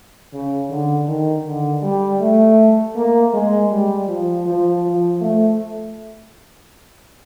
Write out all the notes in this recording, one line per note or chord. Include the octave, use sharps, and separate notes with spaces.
C#3
D3
D#3
D3
G3
A3
A#3
G#3
G3
F3
F3
F3
A3